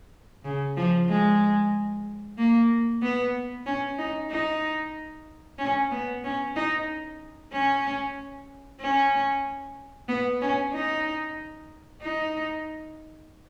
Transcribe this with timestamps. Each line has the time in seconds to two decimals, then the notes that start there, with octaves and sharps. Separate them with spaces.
0.45 C#3
0.77 F3
1.09 G#3
2.38 A#3
3.02 B3
3.66 C#4
3.98 D#4
4.31 D#4
5.59 C#4
5.91 B3
6.24 C#4
6.56 D#4
7.52 C#4
8.81 C#4
10.09 B3
10.41 C#4
10.74 D#4
12.02 D#4